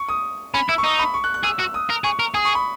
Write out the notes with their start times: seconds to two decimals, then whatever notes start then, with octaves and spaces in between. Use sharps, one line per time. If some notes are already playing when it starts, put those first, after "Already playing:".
Already playing: C#6
0.09 D#6
0.54 C#4 B5
0.69 E4 E6
0.78 C#6
0.84 D#4 D#6
0.99 B5
1.14 C#6
1.24 F#6
1.34 F#6
1.44 G#4 E6
1.59 F#4 E6
1.74 D#6
1.90 A#4
2.04 G#4 C#6
2.20 A#4
2.34 G#4 D#6
2.45 C#6
2.55 B5